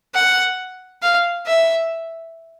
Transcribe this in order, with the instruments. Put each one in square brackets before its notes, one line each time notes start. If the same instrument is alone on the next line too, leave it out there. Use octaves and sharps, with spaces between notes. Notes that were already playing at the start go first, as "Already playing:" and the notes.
[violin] F#5
F5
E5